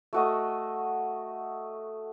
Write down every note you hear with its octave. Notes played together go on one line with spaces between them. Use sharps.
A3 F#4 D#5